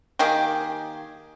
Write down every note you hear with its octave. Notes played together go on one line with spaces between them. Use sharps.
D#3 A#3 G4 G#4